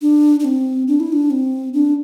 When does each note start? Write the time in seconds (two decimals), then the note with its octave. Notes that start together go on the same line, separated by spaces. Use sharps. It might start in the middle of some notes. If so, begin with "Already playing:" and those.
0.01 D4
0.40 D4
0.44 C4
0.88 D4
1.00 E4
1.12 D4
1.30 C4
1.74 D4